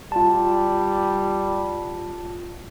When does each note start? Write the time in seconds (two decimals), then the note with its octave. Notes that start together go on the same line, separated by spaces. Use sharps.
0.12 G3 F4 A5